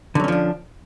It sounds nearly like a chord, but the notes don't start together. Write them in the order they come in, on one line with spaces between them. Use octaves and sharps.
D3 F#3 C#4 F3 D4